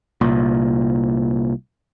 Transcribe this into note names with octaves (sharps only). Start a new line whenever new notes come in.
C2 A#2